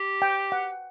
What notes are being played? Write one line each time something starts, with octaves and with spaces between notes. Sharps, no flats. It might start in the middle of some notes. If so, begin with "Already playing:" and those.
Already playing: G4
G5
F#5